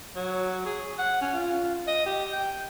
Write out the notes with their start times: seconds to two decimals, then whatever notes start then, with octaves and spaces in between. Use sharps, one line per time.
0.16 F#3
0.65 G#4
0.99 F#5
1.21 C#4
1.33 F4
1.87 D#5
2.06 G4
2.32 G5